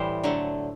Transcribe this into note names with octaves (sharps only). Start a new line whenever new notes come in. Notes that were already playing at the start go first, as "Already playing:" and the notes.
Already playing: A2 E3 G3 C5
D3 F#3 A3